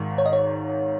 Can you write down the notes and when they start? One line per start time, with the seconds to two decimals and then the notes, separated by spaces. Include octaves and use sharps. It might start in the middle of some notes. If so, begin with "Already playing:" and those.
Already playing: G#1 G#2 D#3
0.18 C#5
0.26 D#5
0.33 C#5